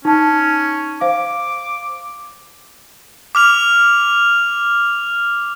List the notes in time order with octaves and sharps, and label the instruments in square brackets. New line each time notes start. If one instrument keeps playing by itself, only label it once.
[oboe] C#4 [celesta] D#4 A5
[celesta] C5 F5 [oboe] D6
[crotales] D6 F6 F7